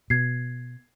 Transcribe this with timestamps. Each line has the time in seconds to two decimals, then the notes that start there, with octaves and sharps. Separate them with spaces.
0.10 B2 G#6 C7